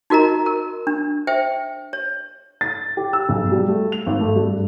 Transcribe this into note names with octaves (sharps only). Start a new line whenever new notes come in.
D#4 F#4 A#4 D#5 A#5
A#4
D4
C5 E5 G5
C#5
A6
G4
E6
B1
G3
A3
F7
G#1
A3
G2